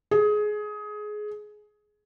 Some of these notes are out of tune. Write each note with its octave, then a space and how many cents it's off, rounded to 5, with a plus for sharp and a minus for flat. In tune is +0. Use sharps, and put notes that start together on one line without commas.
G#4 +20